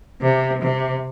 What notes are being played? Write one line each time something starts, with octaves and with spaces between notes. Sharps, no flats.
C3
C3